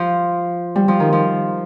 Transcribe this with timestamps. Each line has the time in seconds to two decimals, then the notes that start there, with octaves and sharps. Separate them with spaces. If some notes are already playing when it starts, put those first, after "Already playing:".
Already playing: F3
0.76 G3
0.88 F3
1.00 D#3
1.13 F3